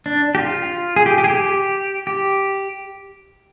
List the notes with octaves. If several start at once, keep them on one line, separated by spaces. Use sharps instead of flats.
D4
G4
F4
G#4
G4
G4
G#4
G4
G4